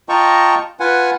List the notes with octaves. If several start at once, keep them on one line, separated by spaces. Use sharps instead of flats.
F4 D#5 G5 A5 A#5 C#6
F4 B4 F#5 G#5